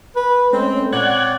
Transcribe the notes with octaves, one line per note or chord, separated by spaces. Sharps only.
B4
G#3 A3 C4 C#4
A#2 C4 C#5 D5 F#5 F#6 G#6